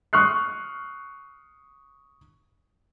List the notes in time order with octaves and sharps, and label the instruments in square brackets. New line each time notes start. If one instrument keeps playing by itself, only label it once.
[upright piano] C#6 D#6 F6 F#6 C7